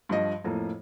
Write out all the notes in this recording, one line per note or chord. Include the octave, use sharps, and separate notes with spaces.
G2 F3 D#5
F2 A2 A#3